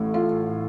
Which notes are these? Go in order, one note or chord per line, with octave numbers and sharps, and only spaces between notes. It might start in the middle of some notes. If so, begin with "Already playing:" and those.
Already playing: A1 A2 A3
F4